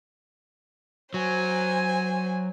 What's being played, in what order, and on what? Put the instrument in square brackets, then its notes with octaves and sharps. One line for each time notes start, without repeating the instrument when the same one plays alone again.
[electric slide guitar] F#3 [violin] C5 G#5